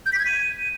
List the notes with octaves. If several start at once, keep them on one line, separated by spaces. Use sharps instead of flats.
G6
B6
G#6
D#7